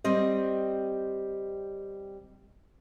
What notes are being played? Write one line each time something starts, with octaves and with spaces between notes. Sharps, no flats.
G3 C4 D#5